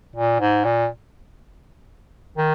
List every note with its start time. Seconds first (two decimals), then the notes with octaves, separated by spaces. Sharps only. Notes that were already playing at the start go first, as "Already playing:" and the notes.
0.16 A#2
0.40 G#2
0.65 A#2
2.38 D#3